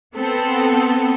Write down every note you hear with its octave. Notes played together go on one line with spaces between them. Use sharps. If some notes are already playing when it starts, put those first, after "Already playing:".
B3 C4 A4